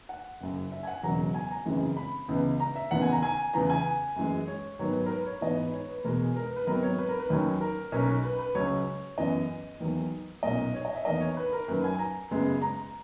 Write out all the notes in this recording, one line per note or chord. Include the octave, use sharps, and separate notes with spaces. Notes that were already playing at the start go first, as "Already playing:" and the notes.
F#5
F#1 F#2 C#3
E5
G#5
F#5
E1 E2 C#3 F#3 A#3 A#5
G#5
A#5
G#1 F#2 C#3 E3 G#3
B5
C#2 C#3 E3 B3
A#5
E5
D#2 C#3 E3 B3 F#5
G#5
A#5
G#5
E2 C#3 E3 B3 A#5
G#5
F#2 E3 G#3
C#5
G#2 D#3 F#3 B3 C#5
B4
C#5
A#4
B4
C#5
G#2 E3 B3 D#5
B4
C#5
B4
E2 B2 G#3 A#4
A#4
B4
B4
G#1 G#2 F#3 B3 A#4
C#5
B4
A#4
B4
D#2 D#3 F#3 C#4
A#4
B1 B2 A#3 C#4
B4
B4
C#2 C#3 F#3 C#4 C#5
F#2 E3 B3 D#5
E2 D#3 F#3 A#3
B1 A#2 A#3 C#4 D#5
C#5
D#5
E5
E2 D#3 A#3 D#5
C#5
B4
A#4
F#2 D#3 F#3 A#3 B4
G#5
A#5
F#2 C#3 G#3 B3
A#5